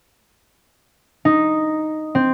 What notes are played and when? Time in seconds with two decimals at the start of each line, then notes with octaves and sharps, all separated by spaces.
1.25 D#4
2.15 C4